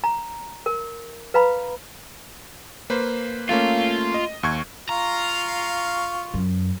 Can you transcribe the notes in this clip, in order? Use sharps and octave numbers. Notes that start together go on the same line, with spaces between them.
A#5
A#4
B4 F5 A#5 B5
A#3 B4 C5
A3 A#3 C#4 F4
D#5
D#2 C#6 G#6
F4 F5 A#5 C#6
F#2